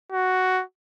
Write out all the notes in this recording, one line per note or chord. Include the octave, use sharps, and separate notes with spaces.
F#4